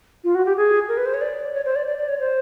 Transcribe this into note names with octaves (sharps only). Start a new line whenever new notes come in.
F4
F#4
G4
G#4
A#4
B4
C5
C#5
D5
C#5
C5
D5
D5
D5
C#5
C5